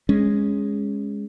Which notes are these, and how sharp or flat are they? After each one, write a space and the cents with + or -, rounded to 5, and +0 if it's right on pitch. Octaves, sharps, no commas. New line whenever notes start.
G#3 -10 C#4 +0